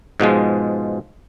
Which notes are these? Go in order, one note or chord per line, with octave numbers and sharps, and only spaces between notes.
G#2 B2 F3 G#3